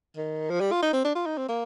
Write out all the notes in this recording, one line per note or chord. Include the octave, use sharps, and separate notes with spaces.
D#3
F3
G3
F4
D#4
C4
D4
F4
D#4
C4
A#3